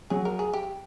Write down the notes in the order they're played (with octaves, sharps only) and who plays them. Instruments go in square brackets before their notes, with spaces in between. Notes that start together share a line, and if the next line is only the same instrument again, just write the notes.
[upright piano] F#3 [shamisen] G#4
[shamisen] A#4
G#4
G4